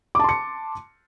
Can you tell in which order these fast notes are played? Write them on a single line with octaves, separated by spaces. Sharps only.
D6 A5 C6 C#7